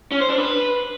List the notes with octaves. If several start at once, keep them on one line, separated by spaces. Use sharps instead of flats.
C#4
C5
D4
B4